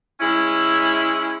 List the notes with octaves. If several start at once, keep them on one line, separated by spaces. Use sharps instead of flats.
G#3 C#4 E4